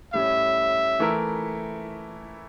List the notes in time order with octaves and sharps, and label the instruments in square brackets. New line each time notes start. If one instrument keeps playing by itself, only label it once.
[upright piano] A2 G3 C#4 [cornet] E5
[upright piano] E3 A3 E4 A#4